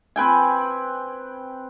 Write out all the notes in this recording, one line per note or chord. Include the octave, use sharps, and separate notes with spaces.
C4 B4 G5 G#5